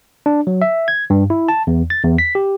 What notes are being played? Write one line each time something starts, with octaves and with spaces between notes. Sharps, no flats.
D4
F#3
E5
G#6
G2
E4
A5
E2
A6
E2
B6
G4